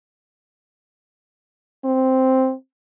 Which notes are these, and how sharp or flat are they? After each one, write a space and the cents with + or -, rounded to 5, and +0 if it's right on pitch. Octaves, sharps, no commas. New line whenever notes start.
C4 +0